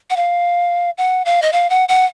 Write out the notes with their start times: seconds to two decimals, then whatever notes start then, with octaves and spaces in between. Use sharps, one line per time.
0.10 F#5
0.16 F5
0.98 F#5
1.25 F5
1.42 D#5
1.53 F5
1.70 F#5
1.89 F#5